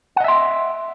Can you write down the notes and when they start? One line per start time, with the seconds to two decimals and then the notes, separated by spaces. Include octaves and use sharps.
0.16 F#5
0.20 D#5
0.24 E5
0.28 C6